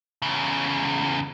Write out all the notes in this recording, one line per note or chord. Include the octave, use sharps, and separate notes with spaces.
E2 C#3